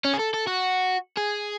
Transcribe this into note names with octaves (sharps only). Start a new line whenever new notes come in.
C#4
G#4
A4
A4
F#4
G#4